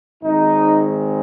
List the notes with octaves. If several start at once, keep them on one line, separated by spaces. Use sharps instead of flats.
G#1 G#2 D#3 G#3 D#4